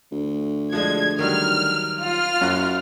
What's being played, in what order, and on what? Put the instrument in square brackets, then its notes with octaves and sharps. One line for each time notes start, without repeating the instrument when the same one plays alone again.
[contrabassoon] D2
[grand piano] F3 G#3 D4 [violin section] G#6
[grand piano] D#3 F#3 G3 [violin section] F6
[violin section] F4 F6
[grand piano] F#1 F#3 F#6 [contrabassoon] F#2